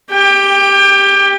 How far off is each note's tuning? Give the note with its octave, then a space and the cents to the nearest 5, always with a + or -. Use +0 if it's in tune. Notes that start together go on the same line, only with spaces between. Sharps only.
G4 +5 G5 +25